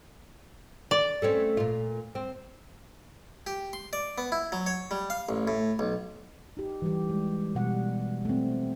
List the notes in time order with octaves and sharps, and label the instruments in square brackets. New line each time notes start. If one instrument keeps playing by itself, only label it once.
[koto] D5
[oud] A3 C4 C#4
A#2 F4
C4
[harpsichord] G4
C6
D5
B3
E4
F#3
C#5
G3
F5
A1
A2
B1
[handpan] D#4 G4
E3 G3 G4
G#3
B2 G3 F#5
A3 C4